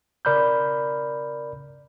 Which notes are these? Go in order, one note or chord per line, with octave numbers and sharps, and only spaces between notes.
C#3 A#4 D5 B5 F6 G6